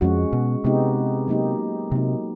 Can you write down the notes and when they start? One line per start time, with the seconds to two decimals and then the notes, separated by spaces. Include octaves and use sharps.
0.01 F2 G#3 C#4 F#4
0.33 B2
0.64 C3 G#3 B3 D#4 G4
1.28 F#3 A#3 D#4 G4
1.92 C3 F#3 A#3 D#4